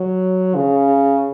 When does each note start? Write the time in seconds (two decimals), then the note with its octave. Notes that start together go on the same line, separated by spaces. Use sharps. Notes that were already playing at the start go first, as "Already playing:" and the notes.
Already playing: F#3
0.55 C#3